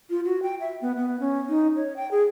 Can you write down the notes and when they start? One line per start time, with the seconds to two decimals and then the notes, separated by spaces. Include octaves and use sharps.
0.10 F4
0.25 F#4
0.43 G5
0.60 E5
0.81 B3
0.97 B3
1.20 C#4
1.49 D#4
1.76 C#5
1.96 G5
2.11 G#4